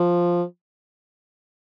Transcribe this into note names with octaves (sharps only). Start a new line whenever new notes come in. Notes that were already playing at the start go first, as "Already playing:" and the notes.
Already playing: F3